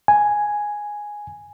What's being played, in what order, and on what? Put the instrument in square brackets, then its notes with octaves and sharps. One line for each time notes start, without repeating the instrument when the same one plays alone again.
[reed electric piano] G#5